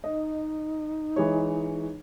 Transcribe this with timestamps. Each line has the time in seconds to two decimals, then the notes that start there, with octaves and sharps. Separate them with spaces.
0.04 D#4 D#5
1.16 E3 G#3 C#5